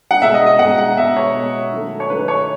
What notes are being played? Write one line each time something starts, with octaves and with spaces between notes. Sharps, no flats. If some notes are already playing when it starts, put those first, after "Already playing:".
F#5
B2 G#3 E5
D#5
D#5
B2 G#3 F#5
F#5
B2 G#3 E5
C#5
B2 G#3
D#3 F#3 A3
C#5
D#3 F#3 A3 B4
C#5